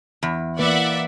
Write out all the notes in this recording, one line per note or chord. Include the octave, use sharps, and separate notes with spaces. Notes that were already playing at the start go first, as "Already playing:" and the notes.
E2
E3 A#3 B4 D5 E5 F#5